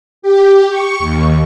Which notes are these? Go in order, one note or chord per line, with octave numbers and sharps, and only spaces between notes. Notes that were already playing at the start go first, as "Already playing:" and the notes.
G4
C#6
D#2